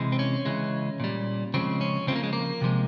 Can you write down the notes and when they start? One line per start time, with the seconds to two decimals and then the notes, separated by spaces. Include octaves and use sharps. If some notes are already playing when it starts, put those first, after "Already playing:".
Already playing: C3 E3 G#3
0.12 C4
0.19 C#4
0.45 C#3 E3 G#3
1.00 A#2 G3
1.54 C#3 F3 G#3 C4
1.81 C#4
2.07 C#3 F3 G#3 C4
2.16 A#3
2.23 G#3
2.33 A#3
2.61 C3 F3 G#3